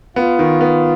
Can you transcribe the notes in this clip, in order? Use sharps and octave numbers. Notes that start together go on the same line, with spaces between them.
B3 F4
D#3
B3